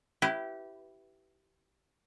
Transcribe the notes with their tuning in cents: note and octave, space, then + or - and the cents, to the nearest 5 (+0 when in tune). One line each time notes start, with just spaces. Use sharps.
E4 +0 G4 -20 B4 +10